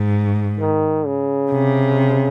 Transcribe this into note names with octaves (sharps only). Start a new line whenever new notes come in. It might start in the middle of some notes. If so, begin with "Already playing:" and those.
Already playing: G#2
D#3
C#3
C3